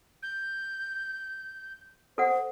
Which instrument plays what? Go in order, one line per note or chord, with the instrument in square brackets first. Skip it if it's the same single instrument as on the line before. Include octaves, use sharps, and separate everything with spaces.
[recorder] G6
[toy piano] A4 F#5 [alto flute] C5